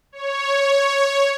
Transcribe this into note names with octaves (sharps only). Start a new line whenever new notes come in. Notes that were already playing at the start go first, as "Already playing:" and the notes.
C#5